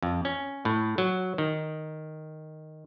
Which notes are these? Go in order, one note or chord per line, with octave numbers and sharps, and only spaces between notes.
F2
C#4
A2
F#3
D#3